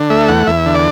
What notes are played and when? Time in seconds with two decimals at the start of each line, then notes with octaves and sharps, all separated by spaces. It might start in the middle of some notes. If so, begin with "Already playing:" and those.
Already playing: D3
0.10 A3 E5
0.28 E2 F#5
0.47 E2 E5
0.66 D3
0.75 D5